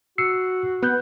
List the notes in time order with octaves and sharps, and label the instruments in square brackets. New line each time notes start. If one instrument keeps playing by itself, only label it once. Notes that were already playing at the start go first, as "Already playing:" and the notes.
[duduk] F#4 [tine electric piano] E6 C7 C#7
[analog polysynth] B3 [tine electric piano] B4 F#6 G6